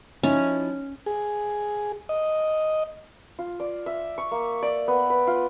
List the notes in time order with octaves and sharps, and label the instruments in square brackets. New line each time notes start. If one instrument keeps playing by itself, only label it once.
[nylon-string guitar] F3 D#4 E4 [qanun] C#4
[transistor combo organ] G#4
D#5
[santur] F4
D5
E5
C#6
A#3
D5
B3
B4
F4